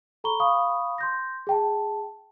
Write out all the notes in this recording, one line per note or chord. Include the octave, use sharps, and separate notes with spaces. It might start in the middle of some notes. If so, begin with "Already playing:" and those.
A4 A#5 B5 C#6 G7
F5 B5 C#6 D#6
C6 G6 A#6
G#4 G5 A5